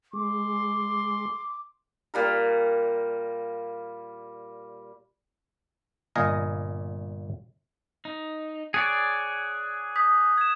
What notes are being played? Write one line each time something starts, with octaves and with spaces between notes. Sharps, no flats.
G#3 C6 D6
A#2 G3 A#4
G1 A#2 D#5 F5 G#5 A#5
D#4
G#4 C#5 D5 F#6
D#6 G6 B6
G#6 E7